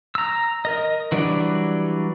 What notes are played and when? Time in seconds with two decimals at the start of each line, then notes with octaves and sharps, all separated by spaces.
0.15 A#5 E6
0.65 A#4 D#5
1.12 E3 F#3 G3 D4 D5